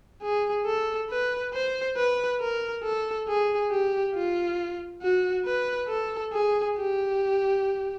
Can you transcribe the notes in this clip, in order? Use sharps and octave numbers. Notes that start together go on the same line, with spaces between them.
G#4
A4
B4
C5
B4
A#4
A4
G#4
G4
F4
F#4
B4
A4
G#4
G4